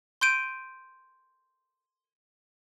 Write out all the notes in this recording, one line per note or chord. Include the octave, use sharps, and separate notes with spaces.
C6 G6 D7 D#7